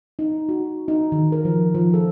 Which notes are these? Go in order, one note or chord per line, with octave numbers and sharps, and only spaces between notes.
D#4
F#4
D#4
D#3
A#4
F3
F3
A4